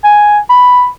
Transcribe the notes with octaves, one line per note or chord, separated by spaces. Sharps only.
G#5
B5